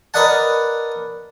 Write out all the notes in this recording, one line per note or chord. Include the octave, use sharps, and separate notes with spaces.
A#4 B4 D5 D#5 F#5 A5